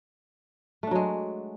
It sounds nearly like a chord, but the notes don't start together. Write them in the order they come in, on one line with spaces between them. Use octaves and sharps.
A3 D4 F#3 G#3